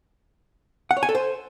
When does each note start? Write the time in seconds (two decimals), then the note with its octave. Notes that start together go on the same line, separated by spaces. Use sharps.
0.91 F#5
0.97 C#5
1.03 G#5
1.09 A4
1.15 C5